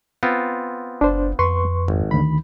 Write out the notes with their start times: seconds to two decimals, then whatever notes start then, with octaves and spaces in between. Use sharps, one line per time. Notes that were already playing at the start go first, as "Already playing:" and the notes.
0.23 B3 C4 F4
1.01 F#1 D4 C5
1.39 F2 B4 C6 C#6
1.88 G#1
2.11 D2 D#3 B5